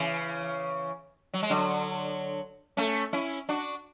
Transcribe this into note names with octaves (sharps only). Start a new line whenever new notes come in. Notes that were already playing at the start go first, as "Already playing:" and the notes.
Already playing: C#3 E3
F#3
G#3
D3 F#3
A3 C#4
C#4 E4
D4 F#4